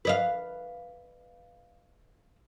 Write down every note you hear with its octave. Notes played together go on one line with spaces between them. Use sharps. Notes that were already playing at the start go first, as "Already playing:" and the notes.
B4 D#5 F5